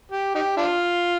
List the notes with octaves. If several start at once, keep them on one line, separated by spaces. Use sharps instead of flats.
G4
D#4 G4
D4 F4